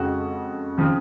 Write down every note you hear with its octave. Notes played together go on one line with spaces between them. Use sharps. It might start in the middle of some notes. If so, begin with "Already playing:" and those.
Already playing: F2 C#3 G#3 C4 F#4
C#3 F3 C4